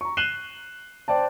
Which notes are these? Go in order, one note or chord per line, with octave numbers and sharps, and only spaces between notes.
A#5 C#6
F#6 C7 D#7 E7 F#7 G7
C5 D5 G5 A5